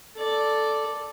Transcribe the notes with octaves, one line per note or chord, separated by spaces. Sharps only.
A4 D5